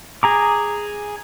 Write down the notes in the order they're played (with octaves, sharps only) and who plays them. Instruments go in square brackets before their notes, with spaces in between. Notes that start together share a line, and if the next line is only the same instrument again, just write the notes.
[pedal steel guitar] G#4 A#5 D6